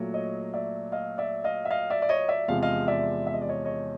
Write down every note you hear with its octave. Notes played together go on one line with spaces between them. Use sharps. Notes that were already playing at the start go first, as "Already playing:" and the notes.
Already playing: A#2 F#3 A3
C#5 D#5
D5 E5
D#5 F5
D5 E5
D#5 F5
E5
D#5 F5
D5 E5
D5
C#5 D#5
D5 E5
E2 C3 F3 G#3 F5
D#5 F5
D5 E5
E5
D#5
D5
C#5 D#5
C#5 D#5